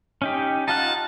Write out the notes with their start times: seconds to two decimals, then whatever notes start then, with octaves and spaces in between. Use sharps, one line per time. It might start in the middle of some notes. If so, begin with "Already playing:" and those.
0.22 C#4 D#4 G4
0.68 D#4 F4 F#5 A5